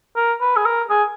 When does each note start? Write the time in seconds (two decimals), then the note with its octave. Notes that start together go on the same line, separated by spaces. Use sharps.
0.16 A#4
0.41 B4
0.57 G#4
0.66 A#4
0.90 G#4